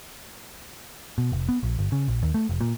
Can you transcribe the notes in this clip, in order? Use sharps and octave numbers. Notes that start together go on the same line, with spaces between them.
B2
F1
B3
A#1
G1
C#3
A#1
D#2
A3
F1
A#2